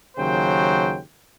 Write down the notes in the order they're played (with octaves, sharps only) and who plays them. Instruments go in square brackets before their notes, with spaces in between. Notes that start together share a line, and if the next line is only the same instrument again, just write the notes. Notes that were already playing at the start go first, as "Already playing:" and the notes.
[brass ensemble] D#2 C#3 F#3 C5 G5